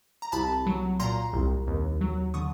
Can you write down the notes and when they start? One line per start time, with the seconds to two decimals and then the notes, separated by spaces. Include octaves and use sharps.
0.22 A#5
0.32 C2 A5 B5
0.66 F#3
1.00 A#2 A#5 C6
1.33 C2
1.67 D#2
2.01 F#3
2.34 D3 C#6 D#6